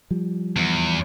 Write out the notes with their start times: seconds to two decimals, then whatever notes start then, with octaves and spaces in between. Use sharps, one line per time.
0.11 F3 G3
0.56 E2